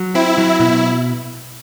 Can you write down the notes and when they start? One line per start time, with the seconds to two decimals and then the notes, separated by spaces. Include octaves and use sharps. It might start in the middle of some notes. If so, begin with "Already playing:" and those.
Already playing: F#3
0.15 C4 E4
0.38 F#3
0.60 B2 E4